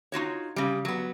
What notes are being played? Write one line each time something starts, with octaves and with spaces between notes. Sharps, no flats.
D#4 F4 F#4 C#5
C#3 G3
F#3 B3